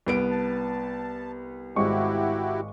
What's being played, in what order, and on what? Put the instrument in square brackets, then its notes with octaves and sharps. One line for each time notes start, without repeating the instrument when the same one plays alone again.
[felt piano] C2 B3 D7
[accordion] A5
[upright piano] G#1 G#3 C#6 [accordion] E4 F#4 G4